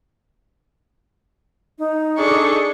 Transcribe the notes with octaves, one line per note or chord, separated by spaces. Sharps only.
D#4
D4 G#4 A4 C#6